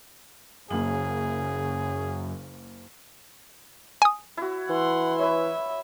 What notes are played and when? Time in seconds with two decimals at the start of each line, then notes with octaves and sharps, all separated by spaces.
0.71 F#1 F#2 C#3 A#3 G#4 F#7
4.02 G#5 D#6
4.37 E4 F#4
4.69 E3 F#5 C6
5.19 B4 C#5 E5